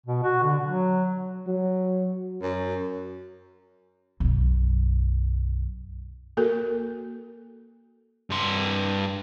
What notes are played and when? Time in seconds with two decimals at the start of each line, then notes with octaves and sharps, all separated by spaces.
0.06 B2
0.23 F#4
0.43 D3
0.66 F#3
1.48 F#3
2.42 F#2
4.20 B1 F#2
6.37 A#3 F#4 A4 A#4
8.30 G2 C6